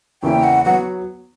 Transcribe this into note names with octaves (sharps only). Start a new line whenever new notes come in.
E2 C#3 E3 A#3 G5
F#5
F#3 B3 F#5